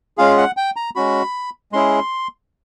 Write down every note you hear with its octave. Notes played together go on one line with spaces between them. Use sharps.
G#3 C#4 F4 G#4 F5
F#5
G5
A#5
G#3 C#4 F#4 B5
G#3 C#4 E4 G#4 C6